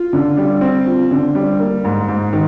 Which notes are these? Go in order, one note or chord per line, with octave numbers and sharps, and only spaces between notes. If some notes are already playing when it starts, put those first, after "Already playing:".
Already playing: F4
D3
G3
C4
F4
D3
G3
A#3
G#2
G#2
D#3